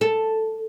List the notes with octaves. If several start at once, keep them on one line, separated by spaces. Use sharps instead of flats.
A4